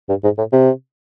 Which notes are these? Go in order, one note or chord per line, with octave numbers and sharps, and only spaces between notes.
G2
G#2
A2
C3